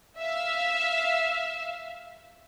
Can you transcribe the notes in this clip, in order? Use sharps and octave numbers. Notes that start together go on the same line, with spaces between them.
E5 F5